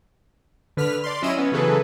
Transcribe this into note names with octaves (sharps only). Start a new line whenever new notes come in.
D3 B4 F6 B6
D5 C6
F#3 C#4 E4 D#5 E6 D#7
B3 C#4
C#3 E3 F#3 G#4 A4 B4